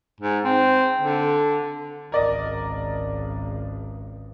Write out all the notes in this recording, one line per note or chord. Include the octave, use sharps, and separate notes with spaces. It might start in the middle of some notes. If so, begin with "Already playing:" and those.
G#2
C4
D3
G#1 C#2 A#4 D5 D#5